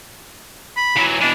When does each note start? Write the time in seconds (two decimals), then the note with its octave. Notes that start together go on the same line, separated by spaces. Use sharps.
0.77 B5
0.97 E3 F#3
1.21 B2 E3 D4